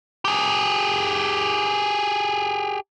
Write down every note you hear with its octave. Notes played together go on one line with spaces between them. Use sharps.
G4 G#4